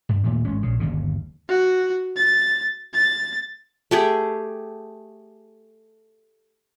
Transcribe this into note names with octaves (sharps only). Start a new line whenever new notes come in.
G2
D#2 A#2 A3
G#1 G#3 C#4
A#1 C#3
G1 D#2 C#3
F#4
A6
A6
A3 G4 G#4